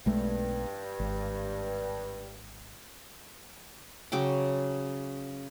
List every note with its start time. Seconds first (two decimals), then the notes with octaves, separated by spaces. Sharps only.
0.06 B1 G2 G#3 A3
1.00 G#1
4.12 C#3 F#3 G5 D6